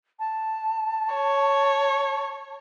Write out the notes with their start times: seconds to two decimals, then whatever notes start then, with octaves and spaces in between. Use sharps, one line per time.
0.19 A5
1.14 C#5